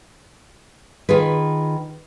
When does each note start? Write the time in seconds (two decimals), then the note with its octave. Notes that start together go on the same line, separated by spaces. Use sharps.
1.09 D#3 F4 G#4 B4